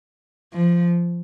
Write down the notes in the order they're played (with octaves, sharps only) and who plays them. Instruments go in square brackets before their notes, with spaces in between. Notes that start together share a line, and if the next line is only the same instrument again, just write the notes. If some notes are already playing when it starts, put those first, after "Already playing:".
[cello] F3